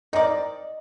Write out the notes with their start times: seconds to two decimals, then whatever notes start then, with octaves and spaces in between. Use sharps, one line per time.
0.13 C4 D#4 A#4 D5 D#5